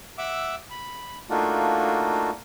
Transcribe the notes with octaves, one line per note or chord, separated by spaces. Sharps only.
E5 F#5 D6 E6
B5
A3 A#3 D4 D#4 F4 F#4